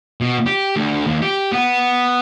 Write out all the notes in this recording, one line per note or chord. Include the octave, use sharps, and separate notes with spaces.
B2
G4
D2
D#2
G4
B3